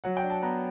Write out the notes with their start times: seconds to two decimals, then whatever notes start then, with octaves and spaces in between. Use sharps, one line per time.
0.04 F#3 F#5
0.17 G5
0.23 D4
0.30 A5
0.42 B3 A#5